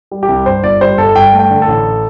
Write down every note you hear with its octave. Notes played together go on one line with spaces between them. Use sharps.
G3
G4
C2
G2 C5
G1 D5
G3 C5
G1 A4
G2 G5
A3
G5
D3
A4
A1